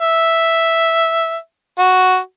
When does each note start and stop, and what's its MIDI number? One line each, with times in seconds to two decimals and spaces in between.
0.01 1.37 76
1.79 2.18 66